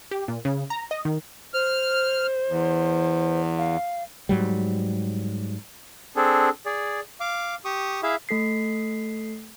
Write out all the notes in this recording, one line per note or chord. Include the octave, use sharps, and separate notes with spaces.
G4
A#2
C#3
A#5
D#5
D#3
C5 F6
E2
F5
G#2 F#3 G3
C4 D4 G#4 A4
G#4 D5
F5 D6
G4 C#6 D#6
E4 G#4 E5 F5
A3 A4 B6 C7